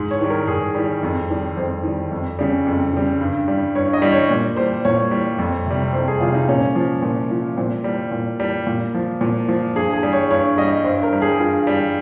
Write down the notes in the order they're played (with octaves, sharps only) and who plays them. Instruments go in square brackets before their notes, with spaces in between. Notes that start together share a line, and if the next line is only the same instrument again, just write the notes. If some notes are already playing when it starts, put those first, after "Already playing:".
Already playing: [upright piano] G#2
C#5
D#3 G3
A#4
G#2 G#4
D#3 G3
F2
D#3 G3
F2 C5
D#3 G3
F2
C#3 G3
F2
C#3 G3
G2
G3
G2 C#5
D#5
G3
C#5
A#2
G3 C5
A#2 C#5
G3
F2
C3 G3
F2 C5
G#4
C3 G3 F4
D#4
A#2 C#4
F3
A#2
F3
A#2 C4
G3
A#2
G3
A#2
F3
A#2
F3
G2 G#4
G#4
G3
C#5
G2 C#5
G3 D#5
G2 C5
A#4
G3
G#4
G2 F4
G3